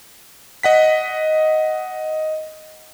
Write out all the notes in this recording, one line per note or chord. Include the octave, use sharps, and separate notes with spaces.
D#5 F#5 B6